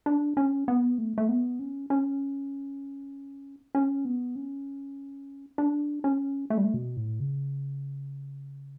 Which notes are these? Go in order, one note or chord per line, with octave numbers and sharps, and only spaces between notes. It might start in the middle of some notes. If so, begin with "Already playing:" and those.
D4
C#4
B3
A3
A3
B3
C#4
C#4
C#4
B3
C#4
D4
C#4
A3
G3
A3
B2
A2
C#3